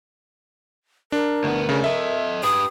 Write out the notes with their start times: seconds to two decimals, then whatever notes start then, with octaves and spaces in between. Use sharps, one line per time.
1.12 D4 A#4
1.44 D2 B3
1.69 C#3 A3 D4
1.84 A4 D#5 E5
2.44 G4 B4 D#6